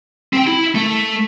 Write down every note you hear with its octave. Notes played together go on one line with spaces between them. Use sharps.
C4 G5
E4
A3